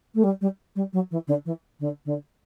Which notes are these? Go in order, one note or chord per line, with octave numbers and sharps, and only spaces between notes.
A3
G3
G3
G3
F#3
E3
D3
E3
D3
D3